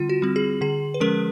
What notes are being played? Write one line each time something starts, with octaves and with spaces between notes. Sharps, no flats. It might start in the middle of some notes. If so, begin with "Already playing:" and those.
Already playing: D3 G3 C4 F4
F#4
G3 C4
G#4
D3 G#4
B4
F3 G#3 C#4 A#4